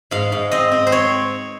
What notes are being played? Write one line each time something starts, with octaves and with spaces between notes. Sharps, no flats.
G#2 F5
G#2
C4 D#5
C4
C5
C4 C#5